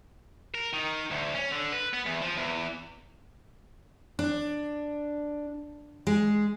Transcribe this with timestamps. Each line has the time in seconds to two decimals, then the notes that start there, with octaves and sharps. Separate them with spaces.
0.55 A#4
0.73 D#3
1.11 D2
1.35 C#4
1.52 D3
1.72 B4
1.93 B3
2.06 E2
2.21 F3
2.36 E2
4.19 D4
6.07 G#3